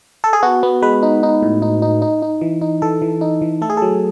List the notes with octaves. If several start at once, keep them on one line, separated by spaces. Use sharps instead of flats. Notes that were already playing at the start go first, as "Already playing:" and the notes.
A4
G#4
B3 F#4
B3
G#3 B4
D#4
D#4
A2
D#4
D#4
D#4
D#4
E3
D#4
E3 A4
E3
D#4
E3
A3 A4
G#4
F#3 A4